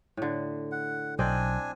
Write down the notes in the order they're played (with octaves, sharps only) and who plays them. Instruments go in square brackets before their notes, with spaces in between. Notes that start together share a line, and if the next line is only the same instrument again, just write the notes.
[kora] A2 D3
[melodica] F#5
[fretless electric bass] B1 [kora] C4 D5 D#5 [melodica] D4 G#5